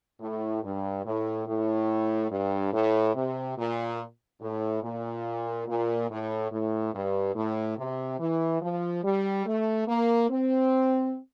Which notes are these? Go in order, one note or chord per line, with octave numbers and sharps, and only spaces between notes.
A2
G2
A2
A2
G2
A2
C3
A#2
A2
A#2
A#2
A2
A2
G2
A2
C3
E3
F3
G3
A3
A#3
C4